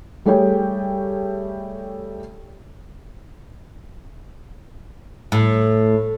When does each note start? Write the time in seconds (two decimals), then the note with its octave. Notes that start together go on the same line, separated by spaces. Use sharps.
0.26 G3 A3 G4 G#4 C#5 G5
5.32 A2